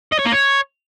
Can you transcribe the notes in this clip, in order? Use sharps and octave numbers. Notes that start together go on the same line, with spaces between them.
D#5
C#5
A#3
C#5